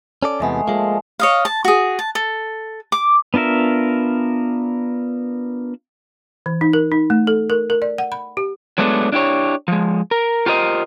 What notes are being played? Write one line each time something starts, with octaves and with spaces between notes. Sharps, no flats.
C#4 A4 D5
E2 C3 G#3 A3 B3
F3 G#3 A#3
C#5 D#5 F5
A5
F#4 G#4
A5
A4
D6
B3 D4 F4 A#4 E5
E3
D#4
A#4
D#4
A3
A4
A#4
A#4
D5
F#5
B5
G4
F#3 G#3 A3 B3 D4
D4 E4 G4 C#5
F3 G#3
A#4
F4 G4 A#4 C5 D#5